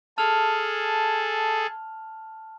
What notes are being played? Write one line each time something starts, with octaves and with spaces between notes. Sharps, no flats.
G#4 A4 A5 F6 F7